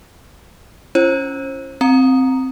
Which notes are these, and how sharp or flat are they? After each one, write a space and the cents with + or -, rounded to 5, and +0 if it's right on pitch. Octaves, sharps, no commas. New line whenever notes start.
C#4 +0 F4 -45 C5 +35
C4 +0 A#5 +0